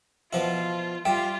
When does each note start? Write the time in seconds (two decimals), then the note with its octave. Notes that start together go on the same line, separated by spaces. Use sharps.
0.33 B2 F3 E4 F4
1.05 G3 F4 E5 G5